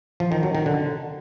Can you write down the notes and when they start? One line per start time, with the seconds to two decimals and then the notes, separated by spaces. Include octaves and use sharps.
0.20 F3
0.32 D#3
0.43 F#3
0.55 D#3
0.66 D3